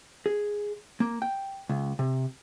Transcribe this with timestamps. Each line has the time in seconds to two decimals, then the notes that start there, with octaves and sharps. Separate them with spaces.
0.26 G#4
1.00 A#3
1.22 G5
1.69 C#2
1.99 C3